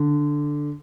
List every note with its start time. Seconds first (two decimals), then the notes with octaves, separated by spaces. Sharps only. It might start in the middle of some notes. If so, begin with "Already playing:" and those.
Already playing: D3